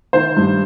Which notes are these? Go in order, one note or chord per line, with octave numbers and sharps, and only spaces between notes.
D#3 C5
G2